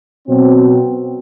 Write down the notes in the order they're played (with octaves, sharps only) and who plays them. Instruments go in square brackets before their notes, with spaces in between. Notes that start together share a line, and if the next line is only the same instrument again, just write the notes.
[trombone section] B2 F#3 C4